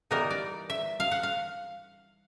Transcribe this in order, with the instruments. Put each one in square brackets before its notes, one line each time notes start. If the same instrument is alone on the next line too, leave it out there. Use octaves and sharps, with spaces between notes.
[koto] E3 G3 B3 D#4 A#4
D5
E5
F5
F#5
F5